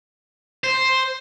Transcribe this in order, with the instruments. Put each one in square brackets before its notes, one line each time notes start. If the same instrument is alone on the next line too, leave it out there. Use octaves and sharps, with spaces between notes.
[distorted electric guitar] C5